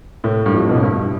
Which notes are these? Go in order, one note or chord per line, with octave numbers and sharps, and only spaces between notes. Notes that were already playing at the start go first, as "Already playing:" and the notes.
A2
G2
F2
B2
A2
G2